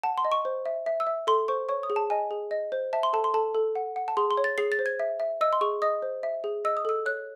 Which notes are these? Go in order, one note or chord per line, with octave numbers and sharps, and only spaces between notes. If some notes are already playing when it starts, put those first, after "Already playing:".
F#5 A5
C6
D#5
C#6
C5
E5
E5
E6
E5
A4 C6
C5 C#6
C#5 C#6
D#6
G#4
A5
D#5 G#5
G#4
D#5
C5
E5 A5
C6
A4 A5
C6
A4 A5
A4
F#5
F#5
A5
G#4 C6
C6
C#5
A6
G#4 C7
A6
C5
G#6
E5
E5
D#5 E6
C6
G#4 C#6
D#5 D#6
C5
E5
G#4
D#5 E6
D#6
A4 E6
C#5 F#6